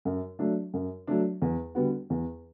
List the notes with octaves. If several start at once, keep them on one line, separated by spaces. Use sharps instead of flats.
F#2
F#3 A3 D4
F#2
F#3 A3 D4
E2
D3 G3 B3 F#4
E2